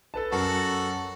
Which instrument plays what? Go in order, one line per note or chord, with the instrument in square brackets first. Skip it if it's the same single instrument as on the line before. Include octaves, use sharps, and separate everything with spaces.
[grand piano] A4 B4 A5
[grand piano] F#2 A#4 A#5 [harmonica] F#4 A4